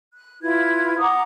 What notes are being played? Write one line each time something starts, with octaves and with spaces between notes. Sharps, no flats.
F#6
E4 F4 B4 G#6
F#5 A#5 D6 D#6